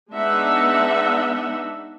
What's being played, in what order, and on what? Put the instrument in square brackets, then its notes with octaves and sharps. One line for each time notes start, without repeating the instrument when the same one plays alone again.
[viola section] G#3 B3 D4 D#4 E5 F#5